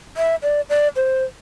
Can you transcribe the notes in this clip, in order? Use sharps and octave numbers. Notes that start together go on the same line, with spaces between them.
E5
D5
D5
C5